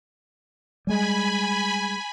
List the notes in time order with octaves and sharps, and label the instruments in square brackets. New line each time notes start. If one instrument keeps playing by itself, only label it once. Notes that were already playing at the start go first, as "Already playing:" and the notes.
[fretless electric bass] G3 G#3 [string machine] G#5 B5